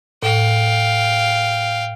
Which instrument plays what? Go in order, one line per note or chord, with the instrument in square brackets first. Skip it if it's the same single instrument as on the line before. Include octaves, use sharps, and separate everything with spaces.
[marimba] A2 [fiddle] F5 G5